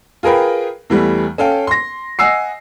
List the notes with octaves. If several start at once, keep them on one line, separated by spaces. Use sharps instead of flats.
F4 G#4 A#4 B4 G5
E2 E3 G3 A3
C#4 A4 F5 G5
C6 A#6
D#5 F#5 G#5 E6 C7